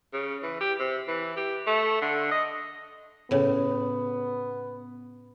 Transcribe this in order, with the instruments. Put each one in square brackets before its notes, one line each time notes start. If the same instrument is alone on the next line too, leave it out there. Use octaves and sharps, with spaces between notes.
[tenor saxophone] C#3
E3
G4
C3
E3
G4
A3
D3
D#5
[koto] A2 C#3 [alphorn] B3